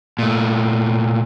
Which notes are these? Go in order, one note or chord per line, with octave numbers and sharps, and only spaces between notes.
A#2 A3